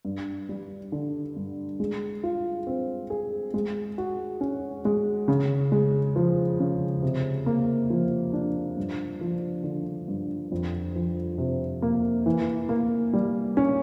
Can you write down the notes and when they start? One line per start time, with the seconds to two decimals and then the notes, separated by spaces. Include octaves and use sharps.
0.05 G2
0.49 G3
0.92 D3
1.36 G2
1.80 G#3
2.23 F4
2.67 C4
3.10 G#4
3.54 G#3
3.98 F#4
4.41 C#4
4.85 G#3
5.28 C#3
5.72 G#3
6.16 F3
6.60 C#3
7.03 C3
7.46 A#3
7.90 F3
8.33 D4
8.77 G2
9.21 F3
9.64 D3
10.08 G2
10.52 F2
10.96 F3
11.38 C3
11.82 A#3
12.26 E3
12.69 A#3
13.13 G3
13.57 C#4